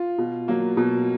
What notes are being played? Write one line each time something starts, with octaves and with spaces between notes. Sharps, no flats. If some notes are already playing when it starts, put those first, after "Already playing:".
Already playing: F4
B2
F#3 A#3
B2